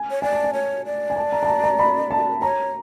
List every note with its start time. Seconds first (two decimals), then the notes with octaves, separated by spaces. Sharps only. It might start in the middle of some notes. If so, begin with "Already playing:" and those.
Already playing: G#5
0.11 C#5
0.22 D5 G#5
0.33 A5
0.44 G#5
0.53 C#5
0.86 D5
1.10 G#5
1.16 A5
1.32 A#5
1.43 A5
1.48 A#5
1.64 A#5
1.79 B5
2.11 A5
2.42 C#5 A#5